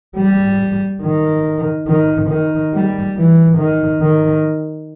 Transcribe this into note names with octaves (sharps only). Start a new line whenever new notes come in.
G3
D#3
D#3
D#3
G3
E3
D#3
D#3